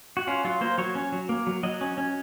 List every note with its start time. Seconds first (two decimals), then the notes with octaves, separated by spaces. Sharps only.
0.17 F#4
0.27 C#4 F4
0.45 F#3 F4
0.61 A#3 C5
0.78 F#3 C#5
0.95 C#4
1.12 F#3
1.29 A#3
1.47 F#3
1.63 F#3 D#5
1.81 C#4
1.98 C#4